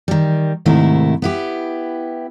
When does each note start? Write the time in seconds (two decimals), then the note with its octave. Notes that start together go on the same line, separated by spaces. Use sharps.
0.08 D#3 G3
0.65 G#2 C3 D#3 A3 E4
1.22 B3 E4 G4